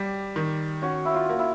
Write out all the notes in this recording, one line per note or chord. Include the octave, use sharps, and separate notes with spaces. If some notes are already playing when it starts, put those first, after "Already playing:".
Already playing: G3 G4
D#3
C#4 F#4
E4
F4
A#3
E4